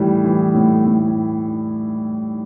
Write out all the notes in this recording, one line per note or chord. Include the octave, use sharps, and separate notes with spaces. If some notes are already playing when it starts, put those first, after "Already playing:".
Already playing: A2 E3 G3
E3
A2
A2